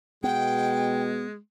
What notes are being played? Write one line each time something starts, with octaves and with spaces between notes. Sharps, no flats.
B2 G#3 B3 G5